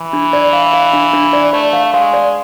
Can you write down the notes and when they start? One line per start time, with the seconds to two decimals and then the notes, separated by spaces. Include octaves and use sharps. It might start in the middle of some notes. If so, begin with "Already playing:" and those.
Already playing: E3
0.13 D4
0.33 D5
0.53 F5
0.73 F5
0.93 D4
1.13 D4
1.33 D5
1.53 A3 D5
1.73 F5
1.93 G#3 F5
2.13 D5